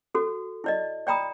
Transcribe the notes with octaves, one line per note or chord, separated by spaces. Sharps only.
F#4 A4
E4 D5 D#5
D5 G5 A#5 B5 D#6